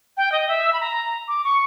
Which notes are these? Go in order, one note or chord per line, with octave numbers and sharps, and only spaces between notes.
G5
D#5
E5
B5
A#5
D6
C#6